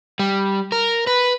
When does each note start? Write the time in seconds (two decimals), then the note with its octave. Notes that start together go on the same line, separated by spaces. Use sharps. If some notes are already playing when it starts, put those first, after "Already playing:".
0.19 G3
0.72 A#4
1.07 B4